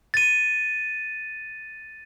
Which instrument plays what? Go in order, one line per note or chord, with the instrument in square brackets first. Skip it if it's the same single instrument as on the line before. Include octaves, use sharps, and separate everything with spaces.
[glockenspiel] A6 D#7